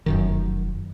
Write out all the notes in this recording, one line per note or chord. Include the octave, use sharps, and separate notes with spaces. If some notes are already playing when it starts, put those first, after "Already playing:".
F1 F#2 D#3